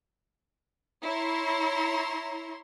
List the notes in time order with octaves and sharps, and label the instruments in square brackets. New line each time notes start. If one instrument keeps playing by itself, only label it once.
[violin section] E4 C#5 A#5 C6